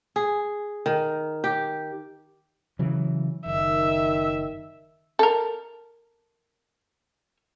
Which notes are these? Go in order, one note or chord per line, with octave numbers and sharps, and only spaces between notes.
G#4
D#3
G4
C#3 E3 F#3
F#1 D#3 E5
A4 A#4